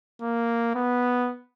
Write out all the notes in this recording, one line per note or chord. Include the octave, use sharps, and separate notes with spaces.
A#3
B3